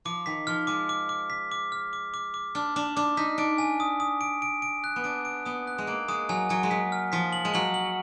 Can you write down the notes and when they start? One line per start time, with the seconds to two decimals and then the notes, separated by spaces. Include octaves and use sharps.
0.05 F3 D6
0.26 D#3 B6
0.47 F3 F6
0.67 G#3 D6
0.89 D6
1.09 D6
1.30 B6
1.52 D6
1.72 F6
1.93 D6
2.14 D6
2.34 D6
2.55 D4 F6
2.76 D4 D6
2.96 D4 D6
3.17 D#4 B6
3.38 D4 D7
3.58 G#5
3.80 D#6
4.00 D#6
4.21 D7
4.42 D7
4.62 D7
4.84 F#6
4.96 B3
5.04 D4 D7
5.25 D7
5.45 B3 D#6
5.67 F#6
5.78 G#3
5.87 A#3 D7
6.08 G#3 D#6
6.29 F#3 G#5
6.49 F#3 G#5
6.63 G#3
6.70 F#3 B6
6.92 F6
7.12 F3 B6
7.33 F#7
7.45 G#3
7.54 F#3 F#7
7.74 F#7